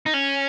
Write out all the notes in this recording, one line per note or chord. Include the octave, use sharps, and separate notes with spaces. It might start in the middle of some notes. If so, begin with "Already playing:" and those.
D#4
C#4